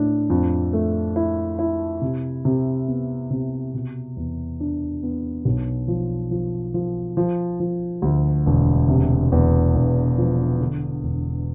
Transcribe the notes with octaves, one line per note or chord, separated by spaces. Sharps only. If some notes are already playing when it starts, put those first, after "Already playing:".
Already playing: A2 D4
F2
A3
E4
E4
C3
C3
B3
C3
B2
E2
D4
B3
B1
F3
F3
F3
F3
F3
D2
E1
C3
E2
E1
F3
D3
E1